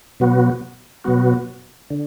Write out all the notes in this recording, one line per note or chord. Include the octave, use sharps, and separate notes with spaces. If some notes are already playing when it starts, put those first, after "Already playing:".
B2 F#3 B3 F#4
B2 F#3 B3 F#4
D3